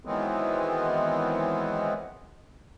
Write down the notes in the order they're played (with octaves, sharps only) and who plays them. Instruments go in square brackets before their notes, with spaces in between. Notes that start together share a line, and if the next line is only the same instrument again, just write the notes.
[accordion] D#3 E3 F#3 G#3 B3 C4